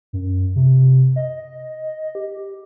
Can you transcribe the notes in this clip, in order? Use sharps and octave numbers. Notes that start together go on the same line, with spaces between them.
F#2
C3
D#5
G4